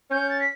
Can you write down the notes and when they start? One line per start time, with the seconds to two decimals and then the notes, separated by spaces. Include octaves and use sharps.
0.11 C#4 G6
0.30 A6
0.40 B6